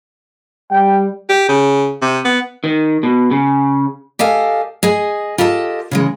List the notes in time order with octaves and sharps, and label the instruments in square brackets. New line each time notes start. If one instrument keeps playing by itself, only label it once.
[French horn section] G3 [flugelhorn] G5
[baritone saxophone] G4
C#3
C3
B3
[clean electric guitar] D#3
B2
C#3
[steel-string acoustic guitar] G4 A4 D#5 F5 G#5
G#4 D#5 G#5
F4 G4 A4 D#5 A5
C#3 E3 G#3